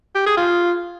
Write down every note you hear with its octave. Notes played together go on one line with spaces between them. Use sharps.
G4
G#4
F4